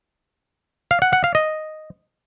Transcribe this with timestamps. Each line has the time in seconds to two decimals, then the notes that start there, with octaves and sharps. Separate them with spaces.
0.91 F5
1.02 F#5
1.13 F#5
1.24 F5
1.35 D#5